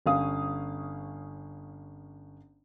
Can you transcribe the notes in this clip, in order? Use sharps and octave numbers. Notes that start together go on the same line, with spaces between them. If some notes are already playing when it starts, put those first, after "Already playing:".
G1 C#4 F5 D#6